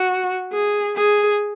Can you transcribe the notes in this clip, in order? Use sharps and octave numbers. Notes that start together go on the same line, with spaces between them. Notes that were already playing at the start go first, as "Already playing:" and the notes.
Already playing: F#4
G#4
G#4